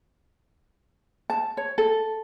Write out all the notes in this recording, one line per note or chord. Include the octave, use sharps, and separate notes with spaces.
A5
C#5
A4